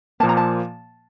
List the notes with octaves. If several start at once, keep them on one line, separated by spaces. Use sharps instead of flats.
A#2 F3 A#3 A5
A#5
A5